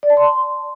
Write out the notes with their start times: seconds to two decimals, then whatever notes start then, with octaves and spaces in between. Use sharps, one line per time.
0.03 D5
0.10 A5
0.17 C6